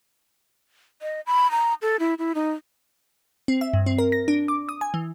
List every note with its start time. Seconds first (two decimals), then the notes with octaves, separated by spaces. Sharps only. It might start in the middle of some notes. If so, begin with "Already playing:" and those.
1.02 D#5
1.27 B5
1.51 A#5
1.82 A4
2.00 E4
2.19 E4
2.35 D#4
3.48 C4
3.61 E5
3.74 G2
3.86 C4
3.99 A#4
4.12 A#6
4.28 D4
4.48 D6
4.69 D#6
4.81 G#5
4.94 E3